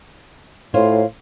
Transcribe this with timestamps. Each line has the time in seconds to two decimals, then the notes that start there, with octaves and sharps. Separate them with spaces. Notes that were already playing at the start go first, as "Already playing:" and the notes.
0.74 A2 F4 C5 C#5